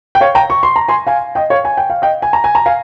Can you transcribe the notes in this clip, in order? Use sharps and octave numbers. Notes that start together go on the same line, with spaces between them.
G5
C#5 F5
G5 A#5
C#6
C6
A#5
G#5 C6
F5 G#5
D#5 G5
C#5 F5
G#5
G5
F5
D#5 G5
G#5
A#5
G#5
A#5
F5 G#5